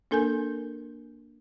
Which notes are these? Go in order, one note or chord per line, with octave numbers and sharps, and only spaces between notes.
A#3 D4 A4 A#4 G#5 G6